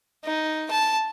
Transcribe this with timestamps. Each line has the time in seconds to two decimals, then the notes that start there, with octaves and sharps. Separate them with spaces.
0.24 D#4
0.71 A5